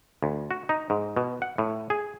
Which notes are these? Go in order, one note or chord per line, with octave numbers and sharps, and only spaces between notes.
D2
F#4
D#4
G#2
B2
F#5
A2
G#4